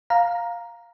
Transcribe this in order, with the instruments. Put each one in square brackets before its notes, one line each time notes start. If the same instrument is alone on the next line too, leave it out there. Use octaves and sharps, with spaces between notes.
[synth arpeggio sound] F5 A#5